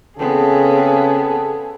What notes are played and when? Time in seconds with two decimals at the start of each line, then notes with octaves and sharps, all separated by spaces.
0.19 C#3 B3 C4 G#4 A4